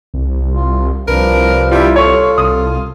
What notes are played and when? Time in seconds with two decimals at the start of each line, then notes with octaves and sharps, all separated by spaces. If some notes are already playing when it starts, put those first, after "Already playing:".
0.14 C2
0.54 F4
1.08 C2 F3 D4 A#4 B4
1.71 G3 E4 F4
1.96 F4 A4 C#5 C#6
2.38 C2 D#6